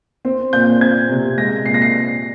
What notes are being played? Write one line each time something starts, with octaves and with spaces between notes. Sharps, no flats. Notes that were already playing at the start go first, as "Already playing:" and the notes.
C4
A#2 G6
C4 G#6
C3
G#3 A#6
A#2 C7
A#6
C7